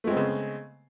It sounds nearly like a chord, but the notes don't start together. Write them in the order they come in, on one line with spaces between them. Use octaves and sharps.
A3 G#3 C4 B3 C#3